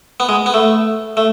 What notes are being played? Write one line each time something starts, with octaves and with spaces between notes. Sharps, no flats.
B3
G#3
B3
A3
A3